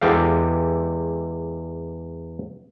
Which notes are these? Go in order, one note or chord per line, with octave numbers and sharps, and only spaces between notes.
E2 G#3 G4 A4 F5